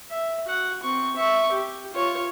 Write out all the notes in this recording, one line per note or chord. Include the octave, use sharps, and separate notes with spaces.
E5
F#4 F#5
C4 C#6
E5 C#6
G4
F4 C#5